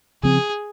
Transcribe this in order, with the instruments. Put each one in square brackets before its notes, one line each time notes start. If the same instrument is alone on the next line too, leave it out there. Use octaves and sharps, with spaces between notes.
[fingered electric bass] C#3 F3 C4 [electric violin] G#4